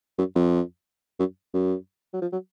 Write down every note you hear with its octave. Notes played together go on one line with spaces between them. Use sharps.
F#2
F2
F#2
F#2
F#3
F3
F#3